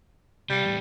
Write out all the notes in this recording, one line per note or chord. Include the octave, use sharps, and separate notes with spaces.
C3 G3 F5
E2 A2